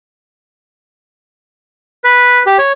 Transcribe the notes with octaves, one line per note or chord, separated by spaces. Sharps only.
B4
G4
C#5